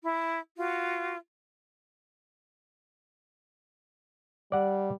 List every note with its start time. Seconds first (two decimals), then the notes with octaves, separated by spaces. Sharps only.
0.03 E4
0.57 F4 F#4
4.52 G3 D5 F#5